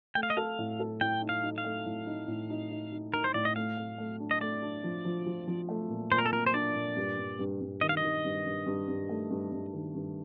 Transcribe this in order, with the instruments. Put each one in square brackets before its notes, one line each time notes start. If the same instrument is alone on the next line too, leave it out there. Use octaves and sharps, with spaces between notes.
[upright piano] A3 [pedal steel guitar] G5
[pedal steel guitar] F5
D#5
[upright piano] A4 [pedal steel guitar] F5
[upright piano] A2
A4
[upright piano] A2 [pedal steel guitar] G5
[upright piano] D#4
[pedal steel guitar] F5
[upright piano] D#4
[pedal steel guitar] F5
[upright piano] A3
A2
D#4
A2
D#4
D#4
D#4
[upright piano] D#4 [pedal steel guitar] A#4
[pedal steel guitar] C5
[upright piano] A2 [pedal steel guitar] D5
[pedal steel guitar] D#5
[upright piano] A3 [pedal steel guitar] F5
[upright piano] A3
A3
D4
[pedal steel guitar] D#5
[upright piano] A3 [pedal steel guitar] D5
[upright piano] D4
F3
F3
F3
F3
A3
A#2
[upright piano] A#2 [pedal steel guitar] C5
[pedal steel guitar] A#4
A4
[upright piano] A#2 [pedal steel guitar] A#4
[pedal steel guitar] C5
[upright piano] D4 [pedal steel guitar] D5
[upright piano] A#2
G2
G2
G2
G2
[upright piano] D#3 [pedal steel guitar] D#5
[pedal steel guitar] F5
D#5
[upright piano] D#3
G2
G2
G2
G2
A3
G2
G2
D#3
G2